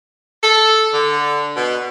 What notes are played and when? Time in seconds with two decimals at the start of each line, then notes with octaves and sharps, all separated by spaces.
0.43 A4
0.93 D3
1.56 B2